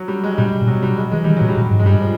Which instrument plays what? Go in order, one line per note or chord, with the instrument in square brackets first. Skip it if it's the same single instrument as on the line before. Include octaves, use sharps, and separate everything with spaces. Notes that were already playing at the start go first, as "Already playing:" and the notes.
Already playing: [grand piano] F#3
G3
G#3
[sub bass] A#2 [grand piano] G3
[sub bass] A#2
[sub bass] B2 [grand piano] F#3
[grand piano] G3
G#3
[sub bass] E3 [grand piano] G#3
[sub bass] D#3 [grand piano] G3
[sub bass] A#2 [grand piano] F#3
[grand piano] G3
[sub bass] A#2
G#2
[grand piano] G#3
[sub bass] G2 [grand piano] G3
[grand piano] F3